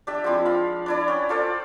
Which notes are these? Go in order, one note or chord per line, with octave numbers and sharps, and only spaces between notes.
D4 G4 E5
F3 G#3 C4 E4
F5 B5
D4 E4 D5
C#4 G5
F4 A4 C5 D5